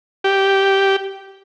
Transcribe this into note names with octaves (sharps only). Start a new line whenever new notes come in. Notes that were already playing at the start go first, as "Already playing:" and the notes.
G4